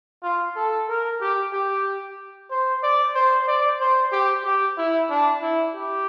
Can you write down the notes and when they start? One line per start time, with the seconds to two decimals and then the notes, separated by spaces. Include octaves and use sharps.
0.23 F4
0.56 A4
0.88 A#4
1.21 G4
1.53 G4
2.51 C5
2.83 D5
3.15 C5
3.48 D5
3.80 C5
4.12 G4
4.45 G4
4.78 E4
5.10 D4
5.42 E4
5.75 G4